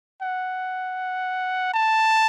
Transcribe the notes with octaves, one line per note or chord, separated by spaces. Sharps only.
F#5
A5